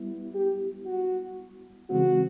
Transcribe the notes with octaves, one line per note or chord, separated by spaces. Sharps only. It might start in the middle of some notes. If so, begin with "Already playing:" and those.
Already playing: G3 B3 E4
G4
F#4
C#3 E3 G#3 C4 F#4